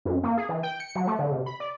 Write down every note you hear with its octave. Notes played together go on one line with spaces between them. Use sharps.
F#2
A#3
G#4
E3
G5
C#7
F#3
A3
D3
C3
B5
D5